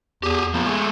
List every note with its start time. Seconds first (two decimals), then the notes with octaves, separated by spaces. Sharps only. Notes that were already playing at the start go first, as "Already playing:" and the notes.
0.23 E2 G4 G#4
0.54 F3 A#3 B3
0.66 G#3 A3